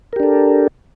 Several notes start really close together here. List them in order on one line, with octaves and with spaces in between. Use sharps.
A#4 G4 D4 A4